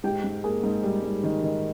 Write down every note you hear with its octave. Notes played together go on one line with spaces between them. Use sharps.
G#2 G4 G5
G#2
A#3 G#4 G#5
G#2
G3
G#2
D#3
D#3